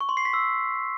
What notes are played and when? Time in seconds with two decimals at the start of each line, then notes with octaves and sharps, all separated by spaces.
0.01 C#6
0.09 C6
0.17 C7
0.25 B6
0.34 E6